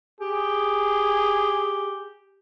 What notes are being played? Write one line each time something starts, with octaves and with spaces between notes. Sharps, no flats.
G4 G#4